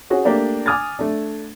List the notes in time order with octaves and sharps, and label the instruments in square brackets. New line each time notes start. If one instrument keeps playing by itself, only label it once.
[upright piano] C#4 F#4 G#4
A3 A#3 D4 G4 D5
G#5 D6 D#6 F6 G#6 A6
A3 D4